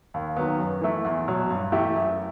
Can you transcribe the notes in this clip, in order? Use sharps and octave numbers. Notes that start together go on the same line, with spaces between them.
D#2
D#3 F#3 B3
F#2
E3 A3 E4
E2
B2 F#3
G2
E3 A3 E4 G4
F#2